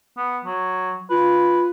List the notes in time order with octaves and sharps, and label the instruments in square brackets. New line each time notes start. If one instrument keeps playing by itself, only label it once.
[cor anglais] B3
F#3
[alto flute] F4 [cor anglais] B4